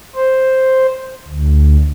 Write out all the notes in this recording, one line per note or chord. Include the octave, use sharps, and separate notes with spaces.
C5
D2